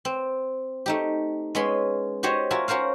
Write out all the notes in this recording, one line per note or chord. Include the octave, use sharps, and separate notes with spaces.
C4
A3 D#4 G4
G#3 B3 C#4 G#4 B5 C6
F#4 G4 C5 C#5 D#5
F4 F#4 A#4 E5 G#5
C#4 F#4 A#4 C5 F5